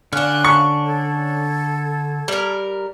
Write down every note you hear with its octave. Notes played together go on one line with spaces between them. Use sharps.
D3 C#4 D4 F5 G#5 F6 F#6
C#6
A4 G#6
G3 A#4